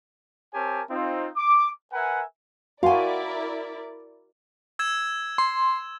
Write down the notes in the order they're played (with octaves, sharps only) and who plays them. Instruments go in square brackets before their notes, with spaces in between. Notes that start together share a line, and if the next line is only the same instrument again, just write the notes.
[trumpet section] C4 G4 A#4 C#5 G#5 A5
C4 D#4 F4
D6
A#4 B4 E5 F#5 G#5
[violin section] E4 A#4 D5 [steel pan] F#4 C6 [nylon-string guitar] F5 G#5
[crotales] E6 G#6 E7
[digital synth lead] C6